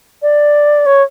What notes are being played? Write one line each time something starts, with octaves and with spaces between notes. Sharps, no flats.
D5
C#5